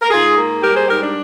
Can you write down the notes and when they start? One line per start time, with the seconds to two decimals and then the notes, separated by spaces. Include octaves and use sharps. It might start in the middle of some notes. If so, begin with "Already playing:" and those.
0.02 A#4
0.11 G#2 F4 G#4
0.37 A#3
0.62 G3 G4 A#4
0.76 G#4 C5
0.88 G#2 G4 A#4
1.02 D4